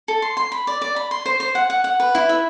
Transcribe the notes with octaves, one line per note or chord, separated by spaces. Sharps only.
A4
C6
C6
B5
D5
D5
B5
C6
C5
C5
F#5
F#5
F#5
B4
E4
E5